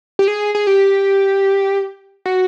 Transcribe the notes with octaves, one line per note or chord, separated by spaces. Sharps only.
G4
G#4
G#4
G4
F#4